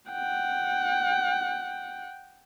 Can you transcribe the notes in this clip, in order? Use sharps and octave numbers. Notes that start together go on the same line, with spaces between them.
F#5 G5